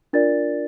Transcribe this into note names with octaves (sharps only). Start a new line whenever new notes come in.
D4 F4 A#4 D5 A6